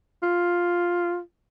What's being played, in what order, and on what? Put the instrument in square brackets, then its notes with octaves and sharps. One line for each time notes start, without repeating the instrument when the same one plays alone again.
[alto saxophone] F4